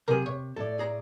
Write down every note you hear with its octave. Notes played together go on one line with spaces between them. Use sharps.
C3 F#3 G#4 A#4
C3 C#5
A2 A4 D5
G#4 A#5